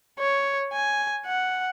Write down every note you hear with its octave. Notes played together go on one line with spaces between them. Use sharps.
C#5
G#5
F#5